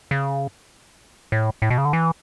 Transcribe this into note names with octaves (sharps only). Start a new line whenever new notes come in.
C#3
A2
A2
B2
C#3
D3
E3